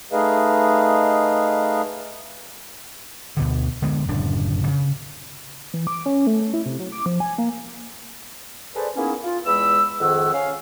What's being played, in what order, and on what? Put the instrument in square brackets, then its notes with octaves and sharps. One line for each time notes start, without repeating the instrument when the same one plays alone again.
[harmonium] A3 D#4 G#4 B4 D#5 F5
[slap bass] D2 B2 D3
D3 G#3 B3
D1 F#2 C#3 D4
C#3
[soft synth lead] E3
D6
C#4
A3
A3
E4
C3
F#3
D6
F3
G#5
A#3
[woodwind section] G#4 A4 B4 C5 D5
A#3 B3 C#4 D#4 E4 G#4
F4
E2 E3 G#3 B5 E6
F2 G#2 D#3 G#4 F#5 E6
C#4 F5